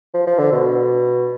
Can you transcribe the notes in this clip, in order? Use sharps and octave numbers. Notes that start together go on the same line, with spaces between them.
F3
F3
D3
B2